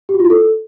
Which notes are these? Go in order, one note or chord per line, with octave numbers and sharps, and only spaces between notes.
G4
F#4
F4
E4
A4